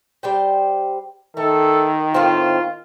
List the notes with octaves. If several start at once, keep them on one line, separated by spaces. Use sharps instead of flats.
G3 C5 G5
D#3 A3 A4
A2 C4 F4